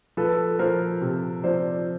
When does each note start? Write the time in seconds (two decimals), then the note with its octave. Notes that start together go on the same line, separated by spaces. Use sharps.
0.17 F3 A4 B4
0.59 F3 A#4 C5
1.01 C3
1.44 F3 C5 D5